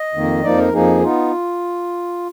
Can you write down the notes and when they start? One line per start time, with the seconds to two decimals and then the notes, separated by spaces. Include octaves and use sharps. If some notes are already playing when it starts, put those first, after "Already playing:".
Already playing: D#5
0.14 F2 D#3 A#3
0.43 F2 F3 A#3 D#4 D5
0.58 A#4
0.73 F2 F3 A#3 D#4 G#4
1.03 B3 D#4 F4